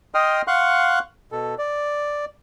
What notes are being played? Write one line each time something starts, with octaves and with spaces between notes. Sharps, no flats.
D#5 G5 C6 D#6 F6
F5 F#5 C6 C#6 F#6
B2 A4
D5